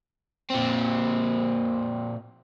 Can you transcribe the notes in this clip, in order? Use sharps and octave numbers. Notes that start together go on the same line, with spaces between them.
A#2 C4